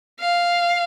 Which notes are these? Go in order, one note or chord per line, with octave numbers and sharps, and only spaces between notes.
F5